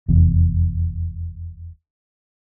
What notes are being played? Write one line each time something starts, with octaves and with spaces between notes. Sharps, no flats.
F1 E2